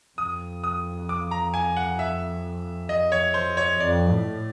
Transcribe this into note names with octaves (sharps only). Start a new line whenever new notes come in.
F2 D#6
D#6
D6
A#5
G#5
F#5
E5
D#5
C#5
C5
C#5
F2 D5
A2